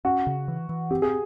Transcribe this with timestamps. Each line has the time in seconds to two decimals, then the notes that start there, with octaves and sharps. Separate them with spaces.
0.05 C#4 F#4
0.27 C#3
0.48 E3
0.69 E3
0.91 C4 G4
1.02 G#4